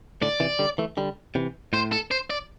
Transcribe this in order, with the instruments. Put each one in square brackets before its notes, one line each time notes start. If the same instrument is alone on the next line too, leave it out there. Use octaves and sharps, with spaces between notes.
[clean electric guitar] A2 D3 [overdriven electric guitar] D5
[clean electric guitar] C3 E3
D3 G3
E3 A3
D3 G3
C3 E3
[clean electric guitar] A2 [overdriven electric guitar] C5
[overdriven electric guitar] A4
C5
D5